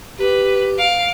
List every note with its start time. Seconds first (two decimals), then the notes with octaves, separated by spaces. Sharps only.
0.19 G4 B4
0.78 F5 D7